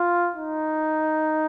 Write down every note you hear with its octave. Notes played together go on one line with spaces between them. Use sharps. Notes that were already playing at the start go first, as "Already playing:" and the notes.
Already playing: F4
D#4